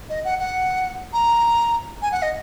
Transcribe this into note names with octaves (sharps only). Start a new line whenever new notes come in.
D#5
F#5
F#5
A#5
G#5
F#5
D#5